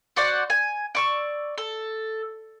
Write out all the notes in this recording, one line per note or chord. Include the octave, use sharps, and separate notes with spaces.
F#4 C5 D5 F#5
G#5
D5 C#6 E6
A4